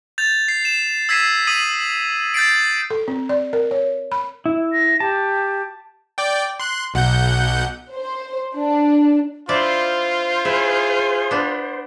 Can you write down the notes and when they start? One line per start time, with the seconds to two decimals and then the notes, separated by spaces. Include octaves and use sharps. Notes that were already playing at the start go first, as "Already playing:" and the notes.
0.18 G6 A6 F7
0.48 C7
0.65 E7
1.09 E6 G#6 B6 C7 D#7 E7
1.47 D#6 B6 D#7 F#7
2.34 G6 A6 C7 D7
2.90 A4
3.08 C4
3.29 D5
3.53 A#4
3.71 C#5
4.12 B5
4.46 E4
4.73 A#6
5.00 G4 A5
6.18 D5 G5
6.60 C6 F#6
6.94 B1 F#5 G6
7.93 C5
8.57 D4
9.49 D4 E4 F4 C5 D5
10.45 E4 G#4
11.31 B3 D4